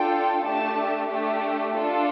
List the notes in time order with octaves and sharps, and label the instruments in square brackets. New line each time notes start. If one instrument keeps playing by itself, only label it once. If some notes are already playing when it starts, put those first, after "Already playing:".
Already playing: [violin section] D4 F4 A4 G5
A3 D4 G4 A5
A3 D4 G4
D4 F4 A4